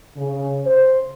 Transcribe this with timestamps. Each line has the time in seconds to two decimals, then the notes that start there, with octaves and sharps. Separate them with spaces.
0.17 C#3
0.66 C5